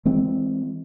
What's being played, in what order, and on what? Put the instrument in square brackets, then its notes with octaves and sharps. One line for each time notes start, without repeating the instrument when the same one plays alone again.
[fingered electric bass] E3 G#3 C4